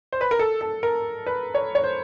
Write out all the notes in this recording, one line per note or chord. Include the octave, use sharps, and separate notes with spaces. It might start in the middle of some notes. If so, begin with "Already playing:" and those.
C5
B4
A#4
A4
A4
A#4
B4
C#5
C#5
C5